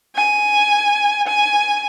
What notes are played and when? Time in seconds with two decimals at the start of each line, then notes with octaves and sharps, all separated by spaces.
0.16 G#5
1.28 G#5